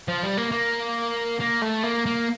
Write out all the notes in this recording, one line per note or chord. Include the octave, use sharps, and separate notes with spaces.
F3
G3
A#3
A#3
A#3
A3
A#3
A#3